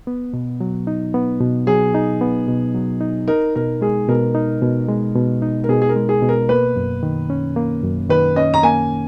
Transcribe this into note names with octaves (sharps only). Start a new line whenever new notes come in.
B3
B2
F#3
D#4
B3
B2
F#3 G#4
D#4
B3
B2
F#3
D#4
D#4 A#4
B2 A#4
G#3 G#4
B2 A#4
D#4
B2
G#3
B2
D#4
A#4
B2 G#4
G#4
A#4
G#3
G#4
B2
A#4
A#3 B4
F#2
D#3
C#4
A#3
F#2
D#3 B4
C#4 D#5
A#5
A#3 G#5